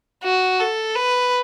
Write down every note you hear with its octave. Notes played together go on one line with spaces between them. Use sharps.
F#4
A4
B4